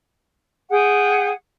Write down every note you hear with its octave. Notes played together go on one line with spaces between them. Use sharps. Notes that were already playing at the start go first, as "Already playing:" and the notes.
G#4 F#5 G5